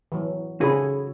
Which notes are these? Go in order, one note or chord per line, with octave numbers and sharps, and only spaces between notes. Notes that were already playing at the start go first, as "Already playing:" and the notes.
E3 F#3
C#3 F#4 G#4 A4 B5